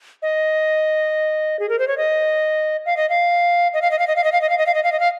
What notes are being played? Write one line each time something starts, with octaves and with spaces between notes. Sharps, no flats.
D#5
G#4
A#4
C5
C#5
D#5
F5
D#5
F5
D#5
F5
D#5
F5
D#5
F5
D#5
F5
D#5
F5
D#5
F5
D#5
F5
D#5
F5